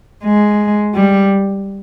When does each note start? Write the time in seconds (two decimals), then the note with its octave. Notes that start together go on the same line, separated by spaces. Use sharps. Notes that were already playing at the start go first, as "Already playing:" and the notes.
0.24 G#3
0.94 G3